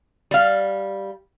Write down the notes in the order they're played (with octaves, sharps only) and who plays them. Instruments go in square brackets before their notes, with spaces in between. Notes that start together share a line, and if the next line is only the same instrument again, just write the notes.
[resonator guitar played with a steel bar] G3 F5